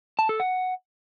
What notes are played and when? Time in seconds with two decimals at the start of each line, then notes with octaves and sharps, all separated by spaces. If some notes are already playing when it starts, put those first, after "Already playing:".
0.19 A5
0.29 A4
0.40 F#5